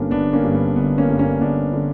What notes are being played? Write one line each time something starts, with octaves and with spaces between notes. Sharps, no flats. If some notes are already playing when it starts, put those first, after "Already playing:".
Already playing: G1 G2 D3 A#3 B3 C#4 D4
G1 B3 D4
A#3 C#4
G2 D3
B3
G1 B3
A#3 C#4
G2 D3
A#3 C#4
G1 B3 D4
D3